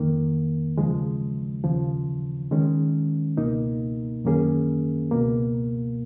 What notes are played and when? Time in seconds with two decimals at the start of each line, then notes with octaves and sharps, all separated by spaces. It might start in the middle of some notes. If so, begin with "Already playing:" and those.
Already playing: F2 D#3 A#3
0.77 D#2 C#3 F3 G#3
1.64 D#2 C#3 F3
2.51 D#3 G#3 C#4
3.37 C#2 B2 A#3 D#4
4.24 F#2 D#3 A#3 C#4 G#4
5.11 C#2 B2 A#3